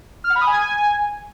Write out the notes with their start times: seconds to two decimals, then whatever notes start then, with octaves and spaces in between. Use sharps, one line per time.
0.24 F6
0.30 F#5
0.36 B5
0.41 D#6
0.47 G#5